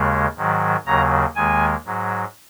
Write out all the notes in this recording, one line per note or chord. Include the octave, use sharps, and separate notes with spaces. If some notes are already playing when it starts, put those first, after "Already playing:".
Already playing: D#2 C#3 G#3
G#2 D#3 F#3
D#2 C#3 F#3 A#5
D#2 D#3 G#3 G#5
G#2 F#3